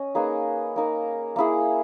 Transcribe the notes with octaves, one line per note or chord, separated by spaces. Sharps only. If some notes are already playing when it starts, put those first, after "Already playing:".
Already playing: C#4 D#5
A#3 D#4 G#4 B4
A#3 D#4 A#4
A#3 E4 G#4